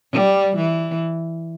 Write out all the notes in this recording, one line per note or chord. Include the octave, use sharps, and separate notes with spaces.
G3
E3